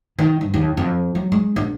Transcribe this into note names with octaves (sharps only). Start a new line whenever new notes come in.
D#3
G2
D#2
F2
F#3
G#3
A#1